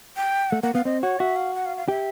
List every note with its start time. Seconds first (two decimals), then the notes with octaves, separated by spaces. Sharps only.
0.17 G5
0.50 A3 F#5
0.63 A#3 F#5
0.74 B3 F5
0.85 C4 D#5
1.02 F#4 C#5
1.20 F#4 E5
1.36 F5
1.55 F#5
1.66 F5
1.77 F5
1.88 G4 E5